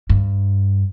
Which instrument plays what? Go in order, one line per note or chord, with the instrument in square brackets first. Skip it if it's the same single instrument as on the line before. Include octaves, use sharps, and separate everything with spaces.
[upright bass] G2